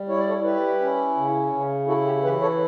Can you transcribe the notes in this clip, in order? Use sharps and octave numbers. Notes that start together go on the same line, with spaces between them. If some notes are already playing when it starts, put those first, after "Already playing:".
Already playing: G3
E4 C#5
D5
A4 C#5
E4 G4 B4
C#4
C#3
C#3
E4 F#4 A4
G4
E3 G4 B4
A4 C#5